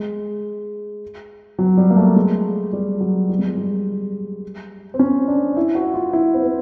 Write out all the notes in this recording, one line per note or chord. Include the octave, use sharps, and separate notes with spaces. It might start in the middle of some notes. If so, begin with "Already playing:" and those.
Already playing: G#3
F#3
G3
A#3
A3
G#3
G3
F#3
G3
G#3
G3
G3
C4
C#4
D4
E4
F#4
F4
E4
C4
B3